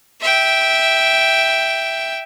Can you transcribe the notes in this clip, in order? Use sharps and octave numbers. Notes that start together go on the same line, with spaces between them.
E5 G5